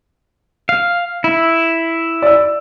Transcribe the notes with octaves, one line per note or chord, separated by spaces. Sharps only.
F5
E4
D5 E6